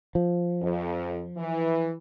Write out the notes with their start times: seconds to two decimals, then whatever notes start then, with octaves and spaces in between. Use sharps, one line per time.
0.15 F3
0.61 F2
1.37 E3